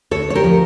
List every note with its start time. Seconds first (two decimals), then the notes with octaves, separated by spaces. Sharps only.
0.11 D2 A4 C#5
0.30 C#5
0.35 G4 A#4
0.44 F3